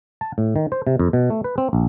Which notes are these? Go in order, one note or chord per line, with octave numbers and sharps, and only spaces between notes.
A5
A2
D#3
C5
C3
F2
B2
A3
B4
C4
A#1